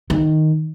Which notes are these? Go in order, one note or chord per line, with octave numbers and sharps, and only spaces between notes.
D#3